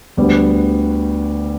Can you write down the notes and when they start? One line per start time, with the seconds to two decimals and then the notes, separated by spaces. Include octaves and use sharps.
0.17 D2 D3 G3 B3